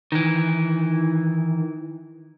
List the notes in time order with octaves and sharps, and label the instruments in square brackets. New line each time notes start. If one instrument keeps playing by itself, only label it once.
[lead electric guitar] D#3 E3